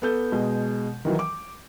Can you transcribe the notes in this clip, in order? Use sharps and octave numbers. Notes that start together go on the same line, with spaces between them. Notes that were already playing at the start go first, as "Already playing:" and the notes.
B3 A4 G6
B2 G#3
D#3 E3 F#3
D6